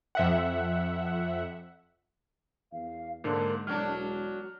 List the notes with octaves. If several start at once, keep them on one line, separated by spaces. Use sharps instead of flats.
F2 E5 F#5
E2 F5
G#2 D3 G#3 A#3 D4
E1 F#3 D4 F6